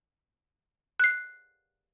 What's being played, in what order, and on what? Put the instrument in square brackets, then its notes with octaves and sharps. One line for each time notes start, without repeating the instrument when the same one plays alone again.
[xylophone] F#6 C7